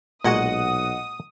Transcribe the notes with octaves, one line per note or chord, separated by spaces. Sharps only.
B1 A#2 G#3 F#4 D#5 F#5 D#6